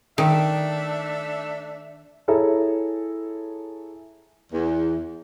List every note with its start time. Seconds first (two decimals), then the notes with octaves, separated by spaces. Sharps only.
0.18 D#3 A3 D4 E5
2.28 E4 G#4 A4 C#5 E5 A#5
4.53 E2